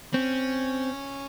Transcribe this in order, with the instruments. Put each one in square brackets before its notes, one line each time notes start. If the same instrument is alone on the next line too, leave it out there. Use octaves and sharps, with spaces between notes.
[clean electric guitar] C4 [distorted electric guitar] C#4